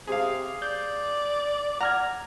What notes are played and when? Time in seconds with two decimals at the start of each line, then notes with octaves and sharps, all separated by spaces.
0.07 C3 G#4 F5
0.62 D5 G6
1.81 F#5 A#5 F6 G#6